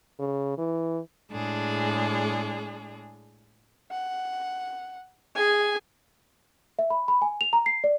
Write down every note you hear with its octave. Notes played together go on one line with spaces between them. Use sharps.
C#3
E3
A2 G#3 D4 G#4
F#5
G#4 G#5
E5
B5
B5
G#5
F7
A#5
C7
D5